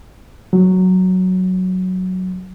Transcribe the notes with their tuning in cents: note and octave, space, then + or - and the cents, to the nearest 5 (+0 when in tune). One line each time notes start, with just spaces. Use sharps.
F#3 +0